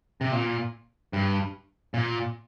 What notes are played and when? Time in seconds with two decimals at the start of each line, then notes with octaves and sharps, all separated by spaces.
0.21 C3
0.32 A#2
1.13 G2
1.94 A#2